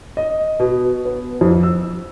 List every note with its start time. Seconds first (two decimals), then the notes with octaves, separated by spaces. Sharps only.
0.17 D#5
0.60 B2
1.05 B3
1.41 F2
1.63 E6